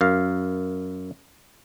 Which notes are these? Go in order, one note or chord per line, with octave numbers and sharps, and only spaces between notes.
F#2 F5